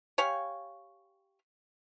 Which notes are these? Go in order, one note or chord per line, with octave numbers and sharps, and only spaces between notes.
G4 C#5 F5 G#5